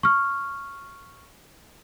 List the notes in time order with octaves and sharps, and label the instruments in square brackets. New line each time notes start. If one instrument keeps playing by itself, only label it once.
[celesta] C#6 F6